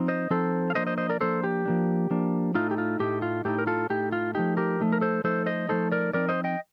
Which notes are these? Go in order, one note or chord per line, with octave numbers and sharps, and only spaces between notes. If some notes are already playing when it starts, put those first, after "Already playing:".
Already playing: F3 C4 D#4
C5 D#5
F3 C4 D#4 A4 C5
F5
F3 A#3 D4 C5 D#5
C5 D#5
C5 D#5
A#4 D5
F3 A#3 D4 A4 C5
G4
F3 A#3 D4
F3 A#3 D4
A2 A3 D#4 F4
G4
F4
A2 A3 D#4 G4
F4
A2 A3 D#4 G4
A#4
F4 A4
A2 A3 D#4 G4
F4
F3 A3 D#4 G4
G4 A#4
F3 A3 D#4
A#4
A4 C5
F3 A3 D#4 A4 C5
C5 D#5
F3 A3 D#4 A4 C5
A#4 D5
F3 C4 D#4 A#4 D5
C5 D#5
D#5 G5